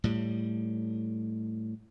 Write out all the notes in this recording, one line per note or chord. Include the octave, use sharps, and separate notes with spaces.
A2 G3